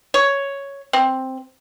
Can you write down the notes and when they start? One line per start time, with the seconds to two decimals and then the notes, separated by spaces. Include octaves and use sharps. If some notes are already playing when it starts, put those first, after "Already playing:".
0.14 C#5
0.93 C4